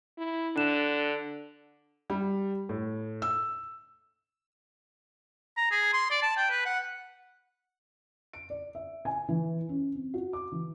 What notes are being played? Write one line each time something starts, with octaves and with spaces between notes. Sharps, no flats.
E4
D3 D4 F#6 E7
G3
A2
E6
A#5
G#4
C6
D5
A5
G5
B4
F#5
D7
D5
E5
G#5
E3
C#4
C4
F#4
D6
E3